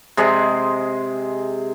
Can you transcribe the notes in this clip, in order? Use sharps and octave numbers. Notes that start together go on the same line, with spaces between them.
C3 G#3 G#4 D#5